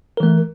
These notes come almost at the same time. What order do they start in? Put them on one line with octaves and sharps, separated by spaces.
A#4 E3 A3